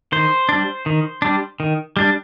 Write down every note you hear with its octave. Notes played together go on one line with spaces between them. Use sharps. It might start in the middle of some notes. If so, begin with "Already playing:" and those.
D#3 C5
G3 D4
D#3
G3 D4
D#3
G3 D4